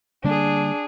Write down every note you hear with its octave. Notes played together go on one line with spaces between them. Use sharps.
D3 G3 A#3 D4 G#4